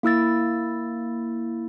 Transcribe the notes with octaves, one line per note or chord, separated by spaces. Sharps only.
A#3 E4 E6 A6